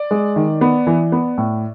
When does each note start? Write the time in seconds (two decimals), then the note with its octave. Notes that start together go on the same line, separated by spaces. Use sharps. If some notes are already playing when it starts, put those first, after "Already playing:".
Already playing: D5
0.11 G#3
0.36 D#3
0.61 B3
0.87 E3
1.12 B3
1.38 A2